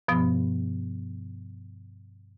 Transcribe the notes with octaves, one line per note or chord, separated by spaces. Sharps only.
G2 B2 F3 B3